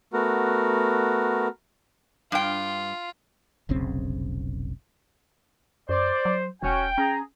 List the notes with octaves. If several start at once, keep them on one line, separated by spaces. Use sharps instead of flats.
A3 B3 F#4 A#4
G2 F4 G5
F1 B1 C#3 C4
F#2 C5 D5
F#3
E1 C#4 F#4 C#5 G5
C#4 G#4 A#5